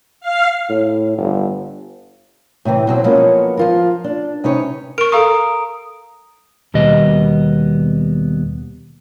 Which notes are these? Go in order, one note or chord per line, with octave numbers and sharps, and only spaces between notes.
F5
A2
G1
A2 C3 D#3 E3
B2 F#3 C4
F3 F#3 G#3 A#3 B3 C#4
F3 F4 A#4
D4
C3 C#4 D#4 B4 C#5
A#4 C#6 D7
A4 F5 A#5 C#6 D#6
D#2 B2 G3 B3 D#5